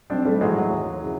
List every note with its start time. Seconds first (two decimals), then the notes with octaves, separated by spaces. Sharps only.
0.10 B1 C4 D4
0.25 G3 A3
0.41 A2 E3 F#3 G#3
0.56 F#3
0.71 D#2
1.02 C#3 E3